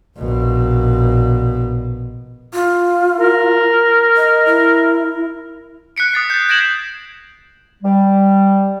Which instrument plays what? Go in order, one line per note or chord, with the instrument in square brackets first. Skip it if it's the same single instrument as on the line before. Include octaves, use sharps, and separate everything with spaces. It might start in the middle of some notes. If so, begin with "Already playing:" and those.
[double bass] A#1 B2
[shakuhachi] F4
[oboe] A#4
[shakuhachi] D#5
E4
[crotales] F#6 B6 C#7 D7
D#6 A6 C7
G6 A6
G6 G#6 A#6 D7 E7 F#7
[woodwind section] G3